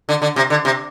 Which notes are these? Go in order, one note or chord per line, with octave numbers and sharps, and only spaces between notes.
D3
D3
C3
D3
C3